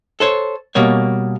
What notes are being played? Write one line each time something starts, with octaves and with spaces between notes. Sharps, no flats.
A4 C5 C#5
B2 G3 A#3 C#5